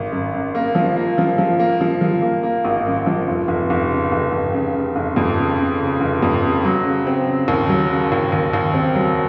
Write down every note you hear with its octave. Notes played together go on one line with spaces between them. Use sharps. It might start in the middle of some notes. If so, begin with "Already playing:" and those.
Already playing: G#1
F#2
F#2
A#3
F3
A#3
F3
F3
A#3
F3
F3
A#3
A#3
G#1
F#2
F3
F1
F1
F1
C#3
F1
F1
C#3
C#3
F1
F2
C#3
C#3
C#3
F1
F2
C#3
F#3
C#3
C4
C#3
D#2
F#3
C#3
D#2
D#2
D#2
C4
F#3